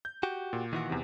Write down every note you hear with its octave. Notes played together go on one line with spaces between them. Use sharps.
G6
F#4 G4
A#2
D#3 E3 F#4
E2 C3